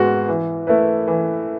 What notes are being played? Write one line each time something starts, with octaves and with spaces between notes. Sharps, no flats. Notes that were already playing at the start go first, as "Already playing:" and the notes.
Already playing: G#2 G#3 B3 F#4
E3
A3 E4 B4
E3